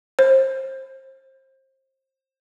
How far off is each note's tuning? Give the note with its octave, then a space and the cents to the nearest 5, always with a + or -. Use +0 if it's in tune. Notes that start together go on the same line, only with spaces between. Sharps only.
C5 +25